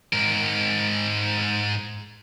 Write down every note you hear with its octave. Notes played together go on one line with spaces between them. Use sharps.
G#2 A#4